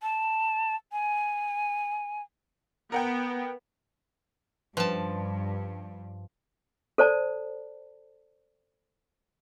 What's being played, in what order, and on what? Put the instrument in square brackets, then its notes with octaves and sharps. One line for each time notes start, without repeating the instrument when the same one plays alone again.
[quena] A5
G#5
[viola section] B3 [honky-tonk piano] A#4 F#5 G5
[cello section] G2 [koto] F3 A5 [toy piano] C#4 B4 C6
[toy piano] A4 C5 D5 A5